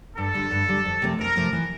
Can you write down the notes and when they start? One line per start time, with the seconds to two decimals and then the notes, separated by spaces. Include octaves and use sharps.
0.17 G2 A4
0.34 D3 G3
0.51 G2
0.68 D3 G3
0.85 F2
1.02 C3 F3 A3 C4
1.19 F2 A#4
1.35 C3 F3 A3 C4
1.53 E3